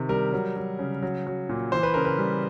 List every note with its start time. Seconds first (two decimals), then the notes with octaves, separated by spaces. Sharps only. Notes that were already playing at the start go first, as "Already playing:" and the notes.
Already playing: C3 D#3
0.09 G3 A#4
0.33 F#3
0.57 F#3
0.79 C#3
1.02 F#3
1.27 F#3
1.49 A#2
1.72 E3 C5
1.83 B4
1.94 C#3 A#4
2.05 B4
2.19 G3